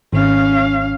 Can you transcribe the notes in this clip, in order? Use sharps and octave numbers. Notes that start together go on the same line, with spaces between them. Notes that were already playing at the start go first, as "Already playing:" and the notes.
G#1 C#4 F5